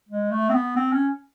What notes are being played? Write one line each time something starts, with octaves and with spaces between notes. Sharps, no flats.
G#3
A3
C4
B3
C4
C#4